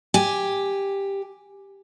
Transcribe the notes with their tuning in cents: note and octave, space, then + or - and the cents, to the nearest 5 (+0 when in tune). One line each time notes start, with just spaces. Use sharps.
G4 +5 G#5 +0